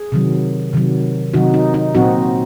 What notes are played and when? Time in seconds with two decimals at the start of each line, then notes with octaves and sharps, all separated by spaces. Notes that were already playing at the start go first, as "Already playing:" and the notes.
Already playing: G#4
0.12 C3 D#3 F#3
0.73 C3 D#3 F#3
1.34 C3 D#3 F#3 D#4 F#4
1.54 D#4
1.74 D#4
1.95 A#2 F#3 C4 D#4 F#4